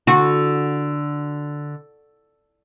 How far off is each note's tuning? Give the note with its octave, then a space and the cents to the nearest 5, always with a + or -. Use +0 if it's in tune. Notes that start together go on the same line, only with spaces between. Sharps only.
D3 +0 F#4 -15